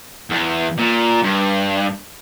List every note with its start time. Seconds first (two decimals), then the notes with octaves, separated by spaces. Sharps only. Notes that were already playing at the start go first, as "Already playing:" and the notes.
0.30 E2
0.78 A#2
1.23 G2